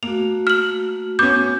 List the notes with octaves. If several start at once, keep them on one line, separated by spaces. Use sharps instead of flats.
A3 A#3 F#4 F7
F6 F#7
B3 C#4 D6 G6